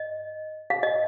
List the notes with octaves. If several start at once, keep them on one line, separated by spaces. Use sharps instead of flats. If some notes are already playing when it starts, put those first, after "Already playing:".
Already playing: D#5
F5
D#5